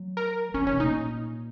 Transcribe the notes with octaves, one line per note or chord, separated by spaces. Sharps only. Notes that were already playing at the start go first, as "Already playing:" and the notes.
Already playing: F#3
A#4
E3 C#4
D#3 C#4
B2
A#2 D#4